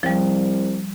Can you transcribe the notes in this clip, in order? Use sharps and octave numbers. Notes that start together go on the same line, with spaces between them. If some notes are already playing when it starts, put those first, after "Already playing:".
C2 F3 G3